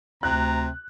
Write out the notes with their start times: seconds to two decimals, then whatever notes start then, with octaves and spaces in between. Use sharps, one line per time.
0.23 D2 C3 A#5 F#6